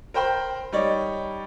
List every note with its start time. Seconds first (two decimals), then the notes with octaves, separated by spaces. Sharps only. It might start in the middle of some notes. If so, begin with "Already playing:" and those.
0.14 A#4 C5 G5 B5 C6
0.72 G3 D#4 C#5 D5